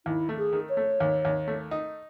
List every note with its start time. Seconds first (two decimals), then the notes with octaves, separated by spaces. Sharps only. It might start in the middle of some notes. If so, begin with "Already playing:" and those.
0.06 D#2 E4
0.29 A3
0.37 G#4
0.53 D#3
0.69 C#5
0.77 A3
1.00 D#2
1.25 D#2
1.48 A3
1.71 D#4